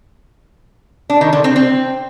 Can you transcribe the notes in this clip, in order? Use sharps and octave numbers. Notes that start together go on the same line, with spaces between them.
D4
D#3
D3
C4
C4